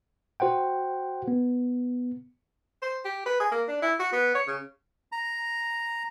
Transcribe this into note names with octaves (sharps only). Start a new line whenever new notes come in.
F#4 C5 F#5 G5
B3
C5
G4
B4
G#4
A#3
D4
E4
F#4
B3
C#5
C#3
A#5